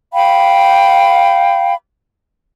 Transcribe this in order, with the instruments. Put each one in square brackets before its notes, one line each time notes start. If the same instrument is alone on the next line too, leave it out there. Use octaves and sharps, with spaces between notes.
[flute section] F5 G5 B5